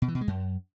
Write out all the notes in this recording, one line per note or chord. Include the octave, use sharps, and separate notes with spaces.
B2
E3
B2
G#3
F#2